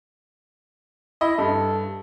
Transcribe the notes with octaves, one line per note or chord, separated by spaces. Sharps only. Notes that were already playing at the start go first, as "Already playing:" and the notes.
E4 D#5
G2 A4